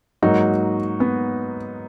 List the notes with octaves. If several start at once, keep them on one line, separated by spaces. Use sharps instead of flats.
G#2 F#3 A#3 D#4 F#4
B3